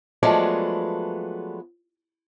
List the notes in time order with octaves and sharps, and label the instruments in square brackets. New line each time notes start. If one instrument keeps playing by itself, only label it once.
[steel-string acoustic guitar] F3 F#3 G#3 A3 B3 D4